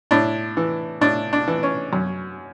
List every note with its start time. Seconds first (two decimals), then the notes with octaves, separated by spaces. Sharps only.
0.11 A2 D4
0.57 E3
1.01 A2 D4
1.33 D4
1.48 E3
1.63 C#4
1.93 F#2